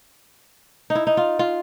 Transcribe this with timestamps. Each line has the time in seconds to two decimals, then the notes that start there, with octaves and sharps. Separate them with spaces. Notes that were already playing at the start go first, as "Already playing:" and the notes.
0.90 D#4
0.95 E4
1.07 D#4
1.17 F4
1.39 F4